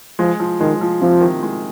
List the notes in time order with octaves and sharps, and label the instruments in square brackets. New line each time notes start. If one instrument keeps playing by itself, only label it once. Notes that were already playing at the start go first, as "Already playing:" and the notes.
[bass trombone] F3 [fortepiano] G#3
[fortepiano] F3
[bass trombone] D#3 [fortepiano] G#3
[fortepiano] F3
[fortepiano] C3 [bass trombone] F3
[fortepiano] D#3
G#3